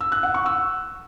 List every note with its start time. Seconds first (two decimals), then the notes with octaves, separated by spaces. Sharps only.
0.01 E6
0.12 F#6
0.23 F#5
0.34 C#6
0.46 E6